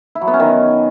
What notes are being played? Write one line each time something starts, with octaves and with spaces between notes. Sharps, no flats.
E4
F#3
B3
C#4
D#3